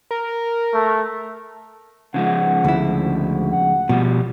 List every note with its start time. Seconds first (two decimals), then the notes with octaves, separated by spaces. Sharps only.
0.11 A#4
0.74 A3
2.14 C#3 F3 G#3 F#5
2.64 D2 E4
3.00 F#4
3.52 F#5
3.89 B2 F3 G3